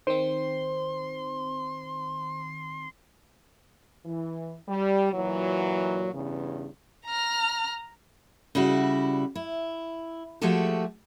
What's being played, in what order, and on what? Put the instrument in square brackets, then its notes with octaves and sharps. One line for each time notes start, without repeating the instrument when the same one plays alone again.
[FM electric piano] D#3 C4 [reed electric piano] C5 [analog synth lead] C6
[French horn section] E3
G3
A#2 E3 F#3
E2 G2 C#3
[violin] A#5 F6
[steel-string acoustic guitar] C#3 G3 E4 F#4
E4
F3 G#3 A3 F#4 G4 A4